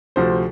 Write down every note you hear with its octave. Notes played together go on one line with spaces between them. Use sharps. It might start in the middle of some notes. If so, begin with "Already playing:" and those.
D2 C3 F3 C5